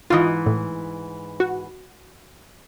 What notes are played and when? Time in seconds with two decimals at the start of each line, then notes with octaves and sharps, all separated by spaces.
0.10 G#2 E3 F4 D#5
0.46 A2
1.40 F#4